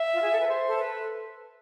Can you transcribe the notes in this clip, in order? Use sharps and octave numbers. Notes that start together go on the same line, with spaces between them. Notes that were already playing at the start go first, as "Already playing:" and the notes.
Already playing: E5
F4
G#4
A4
B4
C5
A4
B4